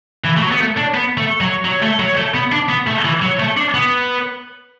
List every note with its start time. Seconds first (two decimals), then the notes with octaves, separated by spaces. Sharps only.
0.24 E3
0.37 A3
0.42 F#3
0.51 B3
0.59 A3
0.77 D4
0.94 B3
1.18 A3
1.41 F#3
1.65 F#3
1.82 A3
1.99 F#3
2.17 A3
2.35 B3
2.52 D4
2.69 B3
2.87 A3
3.05 E3
3.22 F#3
3.40 A3
3.57 D4
3.74 B3